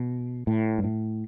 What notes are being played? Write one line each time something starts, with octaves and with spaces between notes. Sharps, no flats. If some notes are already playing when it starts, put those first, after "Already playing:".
Already playing: B2
A2
G2
A2